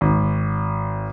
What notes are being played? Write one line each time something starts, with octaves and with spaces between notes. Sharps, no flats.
G#1